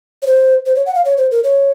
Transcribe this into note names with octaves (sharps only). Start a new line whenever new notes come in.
C#5
C5
C5
C#5
F#5
F5
C#5
C5
A#4
C#5